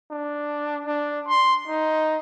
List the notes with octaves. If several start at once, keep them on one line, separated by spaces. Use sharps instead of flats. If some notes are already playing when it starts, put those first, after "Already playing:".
D4
D4
C6
D#4